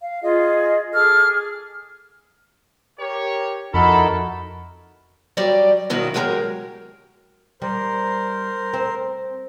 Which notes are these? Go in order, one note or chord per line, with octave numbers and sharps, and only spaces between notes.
F5
F4 G#4 D#5
G#4 A4 D6 F6
G#4
G4 A#4 C#5
F2 D#4 E4 F#4 A4 A#4 B5
F#3 G3 G4 D5
G2 B2 D#3 F#3 E4
F#3 G#3 G4 G#4 A#4 C#5
G3 A#4 C5
C4